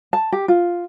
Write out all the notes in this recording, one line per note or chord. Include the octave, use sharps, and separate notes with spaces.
A5
G4
F4